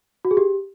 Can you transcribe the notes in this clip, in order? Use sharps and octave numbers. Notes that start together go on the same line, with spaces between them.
F#4
G#4
G4